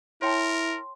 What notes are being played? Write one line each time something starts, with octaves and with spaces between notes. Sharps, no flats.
E4 A#4 C#5 G5 A5 C6